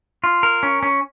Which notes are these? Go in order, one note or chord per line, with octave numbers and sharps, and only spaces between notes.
F4
A#4
C#4
C#4